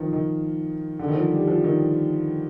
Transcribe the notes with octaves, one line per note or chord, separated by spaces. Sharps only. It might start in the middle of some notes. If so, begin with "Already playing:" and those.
Already playing: D#3 F3
D#3
D3
D#3
F3
G3
F3
D#3